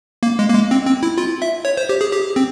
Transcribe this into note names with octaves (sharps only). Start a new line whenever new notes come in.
A#3
G#3
A#3
G#3
C4
C4
E4
F4
E5
C#5
C5
G4
G#4
G4
C4